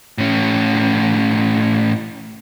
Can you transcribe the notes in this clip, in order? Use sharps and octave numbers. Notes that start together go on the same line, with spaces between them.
A2 C#4